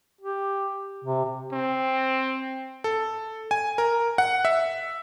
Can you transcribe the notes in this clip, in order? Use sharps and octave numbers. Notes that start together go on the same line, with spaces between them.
G4
C3
C4
A4
G#5
A#4
F#5
E5